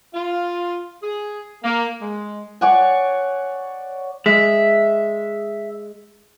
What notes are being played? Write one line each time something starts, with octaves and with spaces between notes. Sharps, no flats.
F4
G#4
A#3
G#3
C#5 D5 F#5 G#5
G#3 E5